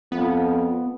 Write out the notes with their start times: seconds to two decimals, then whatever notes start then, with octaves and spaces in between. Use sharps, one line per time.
0.12 F2 B3